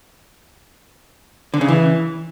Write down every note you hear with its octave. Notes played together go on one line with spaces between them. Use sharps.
D3
C#3
E3